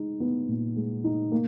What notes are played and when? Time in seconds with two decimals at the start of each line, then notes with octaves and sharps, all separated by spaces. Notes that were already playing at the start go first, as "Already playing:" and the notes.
Already playing: G#3 D#4
0.20 B3
0.48 A#2
0.76 G#3
1.04 D#4
1.32 A#3